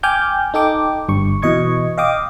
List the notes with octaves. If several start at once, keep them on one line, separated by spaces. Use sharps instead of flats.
G5 G#5 D6 F6 G6
D#4 A4 G5 D6
G1 G2 C#6
B2 E3 D#5 C#6 G#6
D#5 F5 G5 D6 D#6